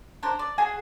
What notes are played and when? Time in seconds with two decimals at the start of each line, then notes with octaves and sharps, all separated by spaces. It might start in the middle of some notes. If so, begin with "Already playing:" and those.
0.23 D4 A#4 C5
0.39 D5
0.58 F#4 G#4 G#5